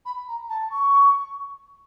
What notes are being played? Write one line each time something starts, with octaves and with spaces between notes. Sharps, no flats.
B5
A#5
A5
C#6